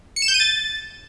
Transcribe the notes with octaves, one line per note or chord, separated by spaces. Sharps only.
C#7
E7
G6
D#7
A6